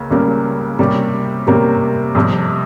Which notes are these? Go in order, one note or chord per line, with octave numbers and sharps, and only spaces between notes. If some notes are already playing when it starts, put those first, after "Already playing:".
Already playing: C#2 C#3 A#3
C#2 C#3 G3 A#3
C3 G3 A#3 C#4 G4
C3 G3 A#3 C#4 G4
F2 C3 G3